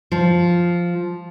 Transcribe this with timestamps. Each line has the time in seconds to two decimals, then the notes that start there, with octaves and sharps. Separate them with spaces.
0.12 F3